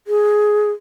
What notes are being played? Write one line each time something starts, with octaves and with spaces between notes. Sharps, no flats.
G#4